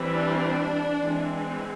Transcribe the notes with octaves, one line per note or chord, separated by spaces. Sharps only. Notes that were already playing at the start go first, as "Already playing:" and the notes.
Already playing: E3 G3 C4
D4
E3 G#3 C4